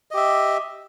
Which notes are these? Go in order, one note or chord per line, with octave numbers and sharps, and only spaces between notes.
G4 D#5 E5